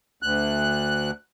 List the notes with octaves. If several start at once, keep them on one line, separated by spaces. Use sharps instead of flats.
D2 F#6